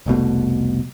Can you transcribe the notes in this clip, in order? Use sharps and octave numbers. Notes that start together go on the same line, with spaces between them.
F1 C2 B2 A3